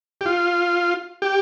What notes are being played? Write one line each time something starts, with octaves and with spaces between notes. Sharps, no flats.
G4
F4
G4